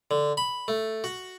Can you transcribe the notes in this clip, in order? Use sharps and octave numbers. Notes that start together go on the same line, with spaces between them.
D3
B5
A3
F#4